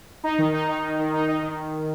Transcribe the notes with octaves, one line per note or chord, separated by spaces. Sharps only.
D#4
D#3
D#4
D#4
D#3
D#3
D#4
D#4
D#3